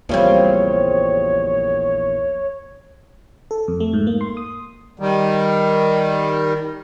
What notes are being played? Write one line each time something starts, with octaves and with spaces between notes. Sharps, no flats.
A#1 E2 A#2 C#3 G3 C4 C#5
A4
F2
A3
G#2
A#3
C6
D#6
D#3 G3